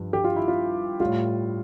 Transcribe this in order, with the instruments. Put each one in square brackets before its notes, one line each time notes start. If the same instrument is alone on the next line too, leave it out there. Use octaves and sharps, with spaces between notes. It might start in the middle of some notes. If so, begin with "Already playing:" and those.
Already playing: [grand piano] G2 F3
G4
F4
E4
F4
A2 G3 F4